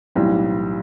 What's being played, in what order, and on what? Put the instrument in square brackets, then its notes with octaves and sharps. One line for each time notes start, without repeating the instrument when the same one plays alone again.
[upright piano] B1 A2 E3 G3 C4